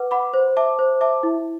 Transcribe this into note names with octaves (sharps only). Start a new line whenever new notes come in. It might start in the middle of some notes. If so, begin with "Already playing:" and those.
Already playing: B4 F#5 D6
F#5 B5 D6
C5
E5 A5 D6
C5
E5 A5 D6
E4